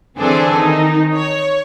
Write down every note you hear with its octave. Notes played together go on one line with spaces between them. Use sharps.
D3 E3 C4 D4 G#4 A4
D#3 D#4
C#5